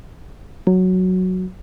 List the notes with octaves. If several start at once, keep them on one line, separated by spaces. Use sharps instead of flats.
F#3